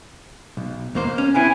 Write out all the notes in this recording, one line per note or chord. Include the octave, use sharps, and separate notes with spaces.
B1
D#2 A#3 C5
C#4
B3 C4 E4 G#5